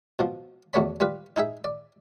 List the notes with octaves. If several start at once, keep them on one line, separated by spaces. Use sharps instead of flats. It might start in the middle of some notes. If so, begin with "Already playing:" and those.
B2 F3
E2 B2 A3 C#5 D5 B5
G3 F4 B4
D#4 E4 G#4 E5
D5